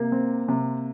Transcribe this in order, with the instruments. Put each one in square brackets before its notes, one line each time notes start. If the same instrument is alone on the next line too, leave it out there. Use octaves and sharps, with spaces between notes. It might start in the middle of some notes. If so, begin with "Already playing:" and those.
Already playing: [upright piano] C3 [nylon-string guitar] A#3
[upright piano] C4
C3